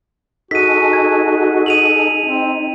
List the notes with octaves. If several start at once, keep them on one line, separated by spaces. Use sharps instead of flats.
D#4 F#4 G#4 A4 B6 D#7
G#6
D#7 F7 F#7
C4 D#4